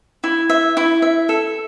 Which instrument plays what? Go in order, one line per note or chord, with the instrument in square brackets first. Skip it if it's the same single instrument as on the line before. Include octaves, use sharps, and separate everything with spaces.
[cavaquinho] E4
E5
E4
E5
A4